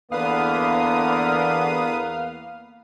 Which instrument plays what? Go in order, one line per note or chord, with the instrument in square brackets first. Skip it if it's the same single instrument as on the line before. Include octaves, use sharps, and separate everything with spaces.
[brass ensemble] E2 A#3 [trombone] D3 [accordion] B3 B4 D#6 [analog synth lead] F5